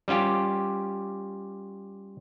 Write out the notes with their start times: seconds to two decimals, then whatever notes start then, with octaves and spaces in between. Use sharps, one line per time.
0.08 G3 C#4 F4 G4